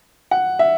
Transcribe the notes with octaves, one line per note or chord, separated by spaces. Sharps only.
F#5
E5